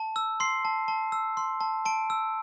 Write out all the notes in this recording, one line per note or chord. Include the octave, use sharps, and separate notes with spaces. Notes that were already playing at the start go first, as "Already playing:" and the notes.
Already playing: A5
E6
C6 C7
A5
A5
E6
C6
A5
A5 D7
E6